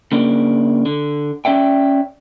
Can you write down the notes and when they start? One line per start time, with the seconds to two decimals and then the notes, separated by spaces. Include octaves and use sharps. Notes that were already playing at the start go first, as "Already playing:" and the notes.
0.12 C#3 A#3 D4
0.86 D3
1.45 C#4 D5 E5 G5